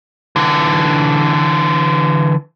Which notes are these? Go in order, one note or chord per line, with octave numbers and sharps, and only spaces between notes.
D3 E3